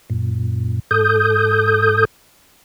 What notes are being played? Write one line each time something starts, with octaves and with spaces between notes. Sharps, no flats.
F#2 A#2
G#2 A4 D#6 G6